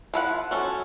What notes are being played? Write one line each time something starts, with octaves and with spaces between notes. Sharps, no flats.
F3 E4 F#5
F#3 C#4 A4